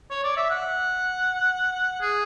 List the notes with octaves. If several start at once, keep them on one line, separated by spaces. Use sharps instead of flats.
C#5
D5
E5
F#5
G#4